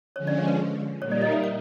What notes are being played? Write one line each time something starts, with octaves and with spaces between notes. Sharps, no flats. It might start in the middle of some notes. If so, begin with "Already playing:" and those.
D3 F3 G#3 C#4 C#5
D5
C#5
B4
A#2 G3 A#3 D#4 C#5
D5
D#5
E5
F5